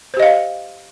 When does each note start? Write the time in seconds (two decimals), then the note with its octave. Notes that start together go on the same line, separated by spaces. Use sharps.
0.14 C5
0.17 G4
0.20 D#5
0.23 F5